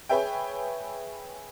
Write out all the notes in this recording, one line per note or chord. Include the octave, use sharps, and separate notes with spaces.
G#4 B4 C#5 E5 G5